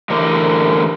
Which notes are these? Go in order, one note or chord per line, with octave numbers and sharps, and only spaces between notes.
D3 E3 A3 G4 A#4